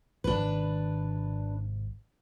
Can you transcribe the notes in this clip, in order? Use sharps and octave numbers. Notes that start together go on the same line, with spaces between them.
G#1 C3 D#3 D4 B4